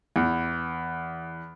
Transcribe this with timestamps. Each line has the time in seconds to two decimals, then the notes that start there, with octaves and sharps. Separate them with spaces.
0.16 E2